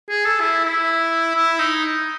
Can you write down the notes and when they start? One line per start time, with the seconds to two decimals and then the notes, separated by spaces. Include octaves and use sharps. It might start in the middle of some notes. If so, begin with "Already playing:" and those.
0.09 G#4
0.25 A4
0.40 E4
0.65 E4
1.36 E4
1.59 D#4